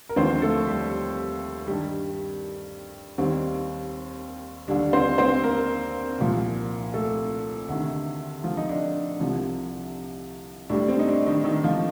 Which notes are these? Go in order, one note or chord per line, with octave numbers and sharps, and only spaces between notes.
A#4
D#2 D3 F3 C4 C5
A3 A4
G3 G4
G2 D#3 G3 G4
D#2 D#3 G3 C4
D#2 D3 G3 D4
C4 C5
C4 C5
A#3 A#4
C2 A#2 F3
A3 A4
D2 C3 D#3
F3 F4
D#4
D4
C2 C3 F3
A2 G3 D4
C4
D#4
D4
D#3 D#4
D#3 D#4
F3 F4